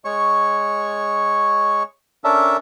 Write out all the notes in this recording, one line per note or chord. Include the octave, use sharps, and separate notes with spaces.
G#3 C#5 C#6
C#4 D4 A4 A#4 E5